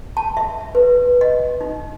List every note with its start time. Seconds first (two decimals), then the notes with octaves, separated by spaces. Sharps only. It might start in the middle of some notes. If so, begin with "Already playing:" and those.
0.17 A5
0.37 E5
0.75 B4
1.21 D#5
1.61 D#4